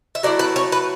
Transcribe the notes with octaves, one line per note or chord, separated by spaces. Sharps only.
E5
F#3 A3 E4 D5
B4
C#5
B4